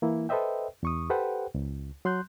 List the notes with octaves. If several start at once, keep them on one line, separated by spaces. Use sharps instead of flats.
E3 A#3 E4
A4 B4 C5 D#5 E5 G5
E2 C#6 D#6
G4 A4 B4 C5 F#5 G5
C#2
F#3 C6 F#6 G6